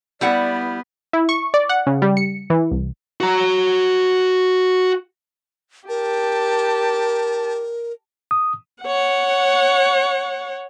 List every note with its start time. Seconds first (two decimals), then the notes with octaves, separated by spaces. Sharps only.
0.21 G3 B3 E4 D5 F#5
1.13 E4
1.29 C#6
1.54 D5
1.69 F#5
1.87 C#3
2.02 G3
2.17 C#7
2.50 E3
2.71 C2
3.20 F#4 A#5
5.89 G4 A#4 A5
8.31 D#6
8.83 C#5 F#5